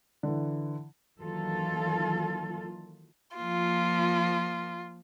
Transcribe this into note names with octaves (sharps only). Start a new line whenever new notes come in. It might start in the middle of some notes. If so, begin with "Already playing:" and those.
D3 E3
D#3 E3 F#3 A#3 F4 A4
F3 A#3 F4